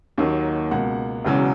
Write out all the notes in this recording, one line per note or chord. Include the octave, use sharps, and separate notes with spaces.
D#2 D#3 F#3 A#3
C#2 B2 A#3 F#5
E1 E2 C#3 F#3